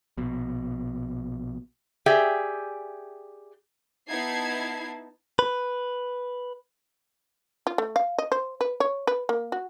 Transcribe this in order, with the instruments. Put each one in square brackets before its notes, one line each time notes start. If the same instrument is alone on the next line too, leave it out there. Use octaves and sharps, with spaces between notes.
[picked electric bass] A#1 B2
[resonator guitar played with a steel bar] G4 G#4 D5 E5 G5 G#5
[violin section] B3 D#4 E4 A5 G#6 C7
[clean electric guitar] B4
[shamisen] F4
A3
F5
D#5
C5
B4
C#5
B4
A#3
F#4